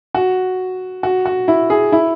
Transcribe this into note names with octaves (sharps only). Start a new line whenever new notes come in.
F#4
F#4
F#4
E4
G#4
E4